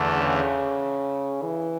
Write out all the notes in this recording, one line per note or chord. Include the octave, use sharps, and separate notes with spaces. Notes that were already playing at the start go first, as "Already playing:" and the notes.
Already playing: E2 D3 A3
C#3
E3